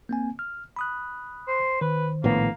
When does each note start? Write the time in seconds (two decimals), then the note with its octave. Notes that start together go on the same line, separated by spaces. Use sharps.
0.09 A#3 C4 G#5
0.39 F6
0.76 B5 D#6 F#6
1.47 C5
1.81 D#3 B4 C5
2.24 A#1 A2 A#3 B3